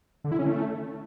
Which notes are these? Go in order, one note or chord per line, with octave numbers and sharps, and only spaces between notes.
D3
E4
C#4
A3